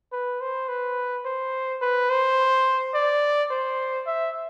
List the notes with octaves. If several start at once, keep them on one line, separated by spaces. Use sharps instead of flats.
B4
C5
B4
C5
B4
C5
D5
C5
E5